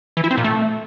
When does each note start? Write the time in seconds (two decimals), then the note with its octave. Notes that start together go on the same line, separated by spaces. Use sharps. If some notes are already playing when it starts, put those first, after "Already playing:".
0.17 E3
0.24 E4
0.31 C4
0.38 A#2
0.44 A3